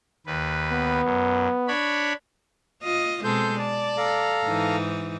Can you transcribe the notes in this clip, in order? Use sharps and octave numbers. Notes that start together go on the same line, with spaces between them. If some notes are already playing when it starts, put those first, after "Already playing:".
D#2 B4
B3
F#2
D4 C#5 B5
F4 D#5
B2 G#3 C4 A4 C6 G6
D5 A5
A4 F5 A#5
G#2 E3 D#4